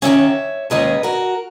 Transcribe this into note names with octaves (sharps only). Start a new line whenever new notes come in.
D#2 D#3 G#3 C#4 C#5 E5
D#2 D#3 G#3 C#4 B4 D#5
F#4 A#4